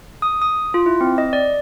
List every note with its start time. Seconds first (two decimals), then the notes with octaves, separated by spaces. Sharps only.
0.22 D#6
0.42 D#6
0.74 F4
0.86 E4
1.01 C4
1.18 D#5
1.33 D5